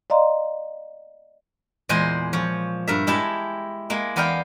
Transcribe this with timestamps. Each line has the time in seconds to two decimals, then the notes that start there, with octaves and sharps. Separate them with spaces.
0.10 D5 D#5 F5 A#5 C6
1.89 E2 A#2 G#3 C5 G#5
2.33 F3 C#5
2.88 G2 A#4 E5
3.07 G#3 E4 G4 A5
3.90 G#3 A#3
4.16 E2 B3 A#4 D5 F5 G5